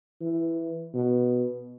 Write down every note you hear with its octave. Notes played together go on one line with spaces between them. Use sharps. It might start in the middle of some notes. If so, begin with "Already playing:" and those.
E3
B2